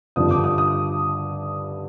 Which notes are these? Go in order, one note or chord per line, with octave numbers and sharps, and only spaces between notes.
G2 D3 F3 D#6
D6
D#6
D#6